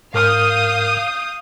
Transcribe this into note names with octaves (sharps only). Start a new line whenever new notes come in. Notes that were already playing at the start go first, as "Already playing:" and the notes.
G#2 A#4 F5 D#6 F6 G6